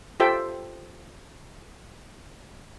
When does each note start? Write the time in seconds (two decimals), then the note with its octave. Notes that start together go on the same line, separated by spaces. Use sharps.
0.20 F4 G4 A4 C5 E5 G5